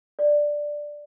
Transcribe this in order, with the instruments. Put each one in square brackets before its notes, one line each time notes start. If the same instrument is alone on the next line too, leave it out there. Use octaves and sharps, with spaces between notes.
[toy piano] D5